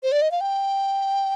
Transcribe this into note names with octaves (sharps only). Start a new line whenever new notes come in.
C5
D5
D#5
F5
G5